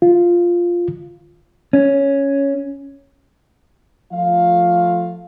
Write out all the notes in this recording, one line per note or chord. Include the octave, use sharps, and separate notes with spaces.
F4
C#4
F3 A3 F4 F5